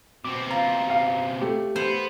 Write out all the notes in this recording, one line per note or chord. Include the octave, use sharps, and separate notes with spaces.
B2 C4 D6
F4 A#5
F5
A3 G4
B3 C5